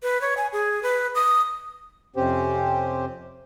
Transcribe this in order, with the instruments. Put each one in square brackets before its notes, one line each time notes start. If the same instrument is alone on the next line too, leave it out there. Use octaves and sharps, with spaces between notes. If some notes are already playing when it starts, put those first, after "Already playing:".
[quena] B4
C#5
G#5
G#4
B4
D#6
[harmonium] F2 C3 C4 C#4 G4 C5